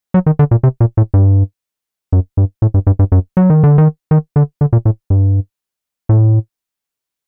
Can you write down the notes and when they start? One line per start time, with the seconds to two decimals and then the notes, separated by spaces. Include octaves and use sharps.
0.14 F#3
0.26 D#3
0.39 D3
0.51 A#2
0.63 C3
0.80 A#2
0.97 A2
1.14 G2
2.12 F#2
2.37 G2
2.62 A2
2.74 G2
2.87 G2
2.99 G2
3.12 F#2
3.37 F#3
3.50 D#3
3.64 D3
3.78 D#3
4.11 D#3
4.36 D3
4.61 D3
4.73 A#2
4.85 A2
5.10 G2
6.09 A2